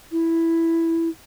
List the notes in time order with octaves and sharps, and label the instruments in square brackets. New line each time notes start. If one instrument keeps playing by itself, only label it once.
[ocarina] E4